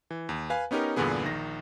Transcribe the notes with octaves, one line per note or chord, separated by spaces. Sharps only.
E3
D#2
B4 F5 G#5
B3 C#4 D#4 G4 A#4
E2 G2 A#2 D3 B3 G#4
A#1 D#3 A#6